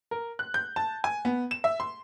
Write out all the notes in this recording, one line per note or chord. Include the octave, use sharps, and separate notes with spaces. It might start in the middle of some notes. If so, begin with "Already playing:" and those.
A#4
F#6
G6
A5
G#5
B3
E7
E5
C6